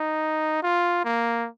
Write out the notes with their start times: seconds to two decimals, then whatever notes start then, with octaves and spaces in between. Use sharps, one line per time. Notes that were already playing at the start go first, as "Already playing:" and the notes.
Already playing: D#4
0.63 F4
1.05 A#3